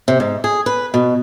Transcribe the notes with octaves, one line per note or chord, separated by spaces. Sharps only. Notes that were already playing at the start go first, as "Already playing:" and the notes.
C3
G#2
G#4
B4
B2